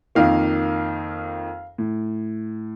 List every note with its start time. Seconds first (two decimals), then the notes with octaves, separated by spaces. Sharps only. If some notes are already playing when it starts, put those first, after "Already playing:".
0.15 F2 D#3 A#3 F5
1.78 A2